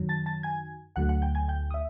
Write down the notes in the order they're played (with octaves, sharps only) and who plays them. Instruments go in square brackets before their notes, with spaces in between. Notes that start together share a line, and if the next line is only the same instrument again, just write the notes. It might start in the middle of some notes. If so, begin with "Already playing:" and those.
Already playing: [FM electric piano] F#2 D#3 F#3
A5 A6
A5 A6
G#5 G#6
D2 D3 F#3 A3 F#5 F#6
F#5 F#6
G5 G6
G#5 G#6
G5 G6
D#6
E5